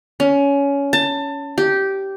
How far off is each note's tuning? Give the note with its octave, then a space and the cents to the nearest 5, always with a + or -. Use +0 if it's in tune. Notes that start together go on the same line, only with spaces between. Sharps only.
C#4 +20
A5 +25
G4 -10